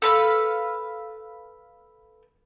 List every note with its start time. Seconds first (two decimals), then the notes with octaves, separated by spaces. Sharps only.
0.02 A4 B4 F5 B5